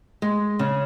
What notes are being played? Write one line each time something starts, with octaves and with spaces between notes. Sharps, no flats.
G#3
C#3